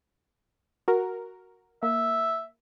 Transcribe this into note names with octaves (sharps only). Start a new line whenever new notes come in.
F#4 A#4
A#3 E5